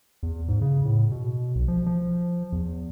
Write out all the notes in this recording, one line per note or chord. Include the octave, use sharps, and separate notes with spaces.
E2
G#2
C#3
A2
B2
B1
F3
F3
E2